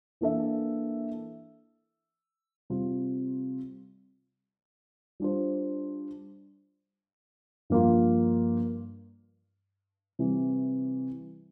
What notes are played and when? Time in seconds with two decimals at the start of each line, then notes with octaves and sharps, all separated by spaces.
0.21 E3 A#3 D4 A4 E5
2.70 C3 G3 C4 F4
5.20 G3 D4 F4 C5
7.70 G2 F3 A#3 F4
10.19 C3 E3 G3